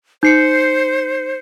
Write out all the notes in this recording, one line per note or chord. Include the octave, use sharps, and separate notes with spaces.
D#4 C5 G6 C7 C#7